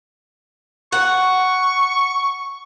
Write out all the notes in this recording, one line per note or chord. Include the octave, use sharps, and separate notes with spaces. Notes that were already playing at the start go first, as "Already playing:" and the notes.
F#5 C#6